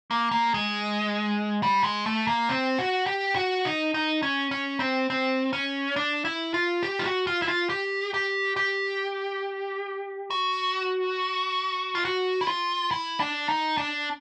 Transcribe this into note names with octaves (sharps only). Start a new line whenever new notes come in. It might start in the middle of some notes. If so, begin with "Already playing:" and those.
A#3
A#3
G#3
G3
G#3
A3
A#3
C4
F#4
G4
F#4
D#4
D#4
C#4
C#4
C4
C4
C#4
D4
E4
F4
G4
F4
F#4
F4
E4
F4
G4
G4
G4
F#4
F4
F#4
E4
F4
E4
D4
D#4
D4